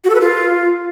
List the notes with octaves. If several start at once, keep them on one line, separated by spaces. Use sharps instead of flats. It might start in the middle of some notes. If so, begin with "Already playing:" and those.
F#4
A4
B4
F4